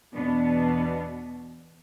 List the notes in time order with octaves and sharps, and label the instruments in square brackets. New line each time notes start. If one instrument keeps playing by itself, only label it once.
[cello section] E2 B2 B3 D4